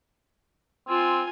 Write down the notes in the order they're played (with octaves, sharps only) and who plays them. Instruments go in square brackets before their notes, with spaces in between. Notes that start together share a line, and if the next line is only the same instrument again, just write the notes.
[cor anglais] C4 [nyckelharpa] F4 G#5